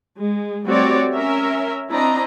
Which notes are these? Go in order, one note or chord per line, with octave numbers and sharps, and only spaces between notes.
G#3
G3 A3 C4 F#4 C#5 D5
C#4 A#4 E5
C4 D4 E4 D#5 A#5